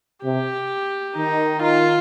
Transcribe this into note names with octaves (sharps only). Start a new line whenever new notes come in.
C3 G4
D#3 D#4
F4